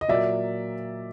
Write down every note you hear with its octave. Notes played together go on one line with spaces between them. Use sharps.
D#5
A#2 F#3 A#3 D5 E5